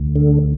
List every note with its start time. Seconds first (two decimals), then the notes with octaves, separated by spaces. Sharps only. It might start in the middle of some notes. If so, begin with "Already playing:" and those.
Already playing: D2
0.16 D3